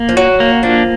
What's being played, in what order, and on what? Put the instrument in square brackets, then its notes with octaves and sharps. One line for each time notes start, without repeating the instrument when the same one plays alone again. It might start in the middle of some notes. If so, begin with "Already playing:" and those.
Already playing: [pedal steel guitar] A#3
[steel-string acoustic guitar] F3
[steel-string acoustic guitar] F#3 [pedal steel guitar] F#4
[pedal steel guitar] A#3
[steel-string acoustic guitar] F3 [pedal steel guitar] D4